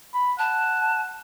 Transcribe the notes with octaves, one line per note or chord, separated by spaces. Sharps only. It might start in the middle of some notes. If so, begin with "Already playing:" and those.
B5
F#5 A5